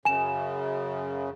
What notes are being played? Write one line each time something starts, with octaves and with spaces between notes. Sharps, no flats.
F#2 C#3 G#5 E7